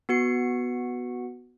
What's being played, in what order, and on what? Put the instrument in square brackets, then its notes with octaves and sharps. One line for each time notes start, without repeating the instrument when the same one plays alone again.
[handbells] B3 F#4 C#7